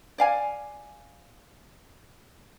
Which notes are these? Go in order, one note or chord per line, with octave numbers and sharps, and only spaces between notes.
D5 F5 G#5